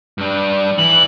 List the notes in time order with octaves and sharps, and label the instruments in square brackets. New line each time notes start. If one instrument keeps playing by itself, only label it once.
[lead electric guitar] G2 D4
[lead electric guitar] E3 [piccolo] F#7